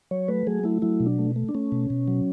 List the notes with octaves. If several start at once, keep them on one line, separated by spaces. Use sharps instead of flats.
F#3 C#5
A3 B4
F#3 G#4
A3 E4
F#3 E4
B2
D4
A3
A3
D4
A3 C#4
B2
B2
F#3